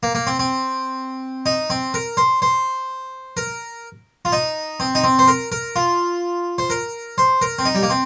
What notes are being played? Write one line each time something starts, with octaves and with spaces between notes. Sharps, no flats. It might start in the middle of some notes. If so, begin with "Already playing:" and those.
A#3
A#3
C4
C4
D#4
C4
A#4
C5
C5
A#4
F4
D#4
C4
D#4
C4
C5
A#4
A#4
F4
C5
A#4
C5
A#4
C4
D#4
G3
A#3
C4